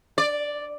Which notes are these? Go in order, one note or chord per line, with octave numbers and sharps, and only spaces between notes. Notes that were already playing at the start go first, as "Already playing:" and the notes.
D5